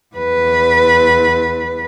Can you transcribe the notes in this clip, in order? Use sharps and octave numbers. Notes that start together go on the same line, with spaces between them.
E2 B4